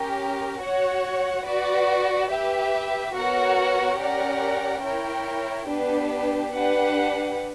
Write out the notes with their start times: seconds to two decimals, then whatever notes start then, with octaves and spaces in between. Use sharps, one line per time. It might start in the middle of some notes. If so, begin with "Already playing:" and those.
Already playing: C#4 G4 A#4
0.60 F#4 C#5 F#5
1.46 F#4 B4 D5
2.30 G4 B4 E5
3.14 B3 F#4 A#4 C#5 F#5
3.98 C#4 G4 A#4 D5 F#5
4.83 E4 A#4 C#5 G5
5.68 B3 D4 G4 B4
6.52 D4 G4 B4 F#5